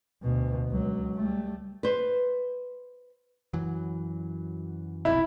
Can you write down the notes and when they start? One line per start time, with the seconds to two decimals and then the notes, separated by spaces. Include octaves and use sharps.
0.23 D2 B2
0.69 C#2 F#3
1.16 G3 A3
1.83 B4 C5
3.53 F#2 E3 F#3
5.05 F1 B1 F2 E4